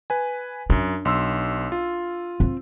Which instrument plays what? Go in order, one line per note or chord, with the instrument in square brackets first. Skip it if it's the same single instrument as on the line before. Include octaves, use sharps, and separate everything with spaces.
[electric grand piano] B4 G#5
[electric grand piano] F#2 [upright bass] D4
[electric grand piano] B1 C6 E6
F4
[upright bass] C4